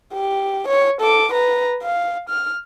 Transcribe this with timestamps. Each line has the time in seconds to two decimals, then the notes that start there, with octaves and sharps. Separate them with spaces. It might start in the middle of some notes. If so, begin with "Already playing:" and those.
0.13 G4
0.68 C#5
1.01 A4 D6
1.32 B4 A#5
1.82 F5
2.29 F6